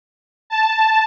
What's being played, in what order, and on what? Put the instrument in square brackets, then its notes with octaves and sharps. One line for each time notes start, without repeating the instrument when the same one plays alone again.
[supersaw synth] A5